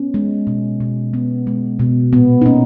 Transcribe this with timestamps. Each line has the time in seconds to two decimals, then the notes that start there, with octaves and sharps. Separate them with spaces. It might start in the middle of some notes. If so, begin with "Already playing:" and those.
Already playing: B3 C#4
0.14 G#3
0.47 B2
0.80 B2
1.13 B3
1.47 G#3
1.79 B2
2.13 A#2 B3
2.42 D#4
2.46 A#3 C#4